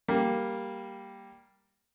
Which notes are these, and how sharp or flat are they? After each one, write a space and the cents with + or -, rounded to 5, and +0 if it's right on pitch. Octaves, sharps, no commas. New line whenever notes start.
G3 +0 A#3 +0